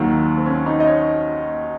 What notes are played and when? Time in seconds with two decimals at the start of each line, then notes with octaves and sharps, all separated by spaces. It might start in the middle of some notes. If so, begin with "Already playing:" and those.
Already playing: D#2 D#3 F#3 F#4
0.38 C4
0.46 C#4
0.66 D#4
0.80 D#5
0.87 C#5